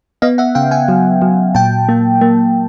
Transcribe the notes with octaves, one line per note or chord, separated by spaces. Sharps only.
B3 D#5 F5
E5 F#5
C#3 F5 G5
F#5 G#5
F#3
F#3
A#2 G5 A5
A#3
A#3